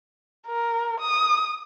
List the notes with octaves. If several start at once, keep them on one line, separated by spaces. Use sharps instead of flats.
A#4
D#6